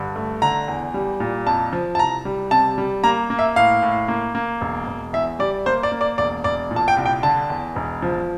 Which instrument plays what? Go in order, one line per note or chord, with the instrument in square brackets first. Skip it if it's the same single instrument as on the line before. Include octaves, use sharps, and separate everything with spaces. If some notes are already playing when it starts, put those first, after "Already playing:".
Already playing: [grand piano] G2 D3
A3
D3 A#5
E2
G3
A#2
F2 A5
F3
A5
C2 A#5
G3
C3 A5
G3
A#3 A#5
A#3
E5
A2 F5
A2
A#3
A#3
E1
E1
E2 E5
G3 D5
A#3 C5
D5
A#3
D5
E1 D5
E1 D5
A#2
A5
G5
C2
G5
D3 A5
E2
E1
F3